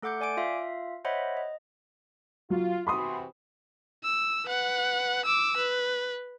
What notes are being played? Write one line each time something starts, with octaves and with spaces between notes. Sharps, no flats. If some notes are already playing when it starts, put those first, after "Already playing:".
A3 A4 F#5 D6 G6 C#7
D5 G#5 D6 D7
F4 E5 F5
C5 C#5 D#5 E5 F#5 B5
D#5
F#3 F4
C3 E3 F#4 B5 C6 D#6
E6
B4 F#5
D6 E6
B4